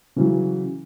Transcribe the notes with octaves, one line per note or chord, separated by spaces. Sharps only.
C#3 E3 F#3